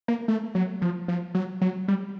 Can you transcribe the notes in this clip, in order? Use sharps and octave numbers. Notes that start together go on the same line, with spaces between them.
A#3
A3
F#3
F3
F3
F#3
F#3
G3